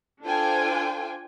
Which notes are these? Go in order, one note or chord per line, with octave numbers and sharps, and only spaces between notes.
D4 F4 A4 C5 G5 G#5